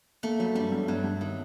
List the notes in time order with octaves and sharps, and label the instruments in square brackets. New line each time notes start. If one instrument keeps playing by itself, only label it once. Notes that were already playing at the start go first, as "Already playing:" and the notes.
[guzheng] A3 [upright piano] A#3
[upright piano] F#3 [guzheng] G3
[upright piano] G2 [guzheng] G3
[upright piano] G2
[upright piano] G2 [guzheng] F#3
[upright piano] G2
[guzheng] D#3